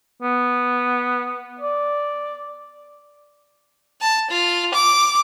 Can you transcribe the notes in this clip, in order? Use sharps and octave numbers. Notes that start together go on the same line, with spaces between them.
B3
D5
A5
F4
D6